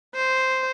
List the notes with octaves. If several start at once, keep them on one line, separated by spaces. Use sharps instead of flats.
C5